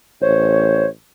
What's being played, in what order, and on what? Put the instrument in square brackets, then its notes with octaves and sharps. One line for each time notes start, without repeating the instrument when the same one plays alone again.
[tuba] A1 [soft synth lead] C5 [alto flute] C#5